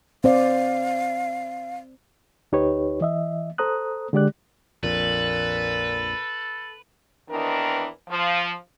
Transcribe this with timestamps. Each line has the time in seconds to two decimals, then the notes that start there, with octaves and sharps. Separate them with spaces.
0.24 C4 C5 D5 F5
2.52 D2 D#4 G4 B4 C#5
3.01 E3 D#5 E5
3.58 A4 C5 A#5 D#6 F#6
4.13 D3 G#3 G4 D5 F#6
4.83 A#1 F2 A#2 A4 B4
7.30 D#2 D#3 E3 B3 D4 A#4
8.09 F3